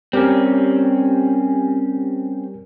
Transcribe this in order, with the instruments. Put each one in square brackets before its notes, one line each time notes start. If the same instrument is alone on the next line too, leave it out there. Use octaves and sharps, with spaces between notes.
[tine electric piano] G3 G4 A#4 [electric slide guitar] C4 C#4